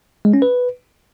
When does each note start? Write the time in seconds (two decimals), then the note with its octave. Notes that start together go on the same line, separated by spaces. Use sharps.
0.25 G#3
0.34 C#4
0.42 B4